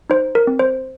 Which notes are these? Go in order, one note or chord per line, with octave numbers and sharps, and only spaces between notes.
D#4 C5
A#4
C4
C5